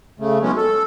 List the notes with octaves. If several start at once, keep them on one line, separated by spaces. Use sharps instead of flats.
C#3 A3
D#3 F#3 G#3 B3 C#4
A4